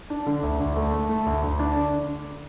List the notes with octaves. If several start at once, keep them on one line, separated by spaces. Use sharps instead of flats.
D4
D3
D2
D2
A3
A3
A3
D2
D2
D4
D3